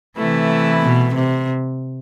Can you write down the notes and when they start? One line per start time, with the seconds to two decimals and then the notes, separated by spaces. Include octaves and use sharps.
0.17 C3 E3 A3 E4 B4
0.83 B2
1.14 C3